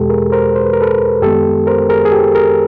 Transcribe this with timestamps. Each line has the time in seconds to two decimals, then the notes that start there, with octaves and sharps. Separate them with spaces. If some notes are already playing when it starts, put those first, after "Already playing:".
Already playing: E2 B2 G#3 G4 A4
0.09 G#4 A#4
0.32 A#4 C5
0.56 C5
0.64 B4
0.73 A#4
0.82 A4 B4
1.22 F#2 D#3 G#3 B3 G4 A4
1.67 A#4 C5
1.89 G#4 A#4
2.05 G#4
2.12 G4 A4
2.35 G#4 A#4